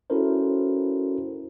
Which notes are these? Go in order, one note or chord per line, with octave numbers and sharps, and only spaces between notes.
C#4 E4 F#4 A4 A#4 C5